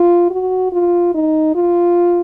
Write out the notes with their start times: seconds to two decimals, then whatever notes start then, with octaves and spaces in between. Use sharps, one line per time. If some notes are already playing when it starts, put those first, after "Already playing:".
Already playing: F4
0.30 F#4
0.72 F4
1.14 D#4
1.55 F4